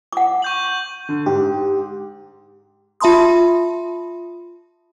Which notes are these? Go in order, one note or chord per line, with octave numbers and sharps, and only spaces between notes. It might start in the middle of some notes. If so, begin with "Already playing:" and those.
F#5 D6
C#6 G6 F#7
D3
G#2 G4
F4 E5 A5 B5 C6 D#6